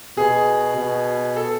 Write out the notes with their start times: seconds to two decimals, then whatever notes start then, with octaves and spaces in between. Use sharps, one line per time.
0.17 B2 G#4
0.77 B2
1.36 A4